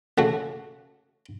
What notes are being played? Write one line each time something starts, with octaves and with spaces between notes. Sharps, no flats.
C#3 A3 F#4